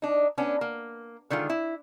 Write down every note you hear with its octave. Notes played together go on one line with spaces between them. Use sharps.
D4 D#4
B3 C#4 D4
A#3
D3 D#3 G#3 F4
E4